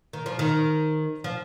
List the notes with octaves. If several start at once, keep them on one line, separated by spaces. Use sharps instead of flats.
D#3
F3
D#3
F3